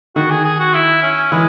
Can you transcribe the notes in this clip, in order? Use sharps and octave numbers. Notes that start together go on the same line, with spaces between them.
D#3 F#4
G#4
G#4
F#4
E4
C#4
E3 G#3